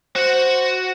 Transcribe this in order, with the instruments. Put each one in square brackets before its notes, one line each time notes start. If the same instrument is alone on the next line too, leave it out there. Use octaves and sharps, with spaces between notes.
[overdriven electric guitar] F#4 F#5 [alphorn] C5